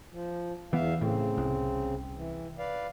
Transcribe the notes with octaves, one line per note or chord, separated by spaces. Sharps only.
F3
E2 E3 B3 E5 F5
A2 C#3 C4
C2
E3
B4 D5 F5